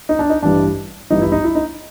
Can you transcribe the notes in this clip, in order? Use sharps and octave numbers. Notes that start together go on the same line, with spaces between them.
D#4
D4
D#4
A1 G2 E3 D4
A1 G2 E3 D#4
E4
D#4
E4
D#4